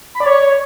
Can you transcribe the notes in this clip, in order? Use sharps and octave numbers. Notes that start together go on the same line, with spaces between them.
B5
D5
C#5